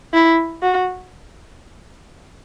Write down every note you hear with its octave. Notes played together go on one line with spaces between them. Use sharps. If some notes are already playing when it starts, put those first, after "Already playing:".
E4
F#4